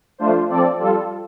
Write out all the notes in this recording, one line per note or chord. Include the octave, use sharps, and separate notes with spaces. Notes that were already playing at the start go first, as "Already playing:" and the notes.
F3 A3 D4 F4 C5
F3 C4 A4 D5
G3 F4 A4